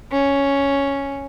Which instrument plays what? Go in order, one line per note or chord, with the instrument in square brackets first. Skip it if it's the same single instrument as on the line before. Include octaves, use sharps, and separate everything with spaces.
[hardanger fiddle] C#4